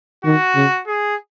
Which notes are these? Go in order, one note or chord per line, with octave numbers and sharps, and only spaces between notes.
D#3 F#4
C#3
G#4